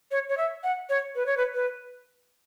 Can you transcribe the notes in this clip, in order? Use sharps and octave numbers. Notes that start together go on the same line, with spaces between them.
C#5
C#5
E5
F#5
C#5
B4
C#5
B4
B4